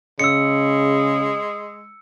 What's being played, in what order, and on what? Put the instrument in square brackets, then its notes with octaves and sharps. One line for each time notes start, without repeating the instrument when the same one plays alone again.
[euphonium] C#3 [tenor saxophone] G#3 [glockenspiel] E6 C#7